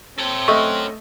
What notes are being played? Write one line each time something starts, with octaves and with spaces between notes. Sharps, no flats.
C4 A4 C#5
A3 C#4 D#5 E5 F#5 C#6